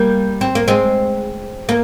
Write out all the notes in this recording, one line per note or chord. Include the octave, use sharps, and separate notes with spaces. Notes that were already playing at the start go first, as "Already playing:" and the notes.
Already playing: G3 A#3
C4
A#3
G#3 C4
A#3